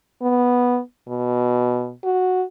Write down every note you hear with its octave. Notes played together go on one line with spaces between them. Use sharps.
B3
B2
F#4